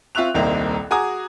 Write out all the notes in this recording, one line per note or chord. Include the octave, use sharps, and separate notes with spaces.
C4 F4 E5 C#6 F#6 F7
D#1 C2 D#3 A#3 C4 F7
F#4 G#4 G#5 A#5 D6 D#6